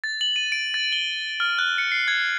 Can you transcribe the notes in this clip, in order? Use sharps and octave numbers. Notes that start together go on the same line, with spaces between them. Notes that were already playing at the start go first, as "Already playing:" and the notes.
A6
F#7
D#7
D7
A6
G7
F6
F#6
C#7
C7
G#6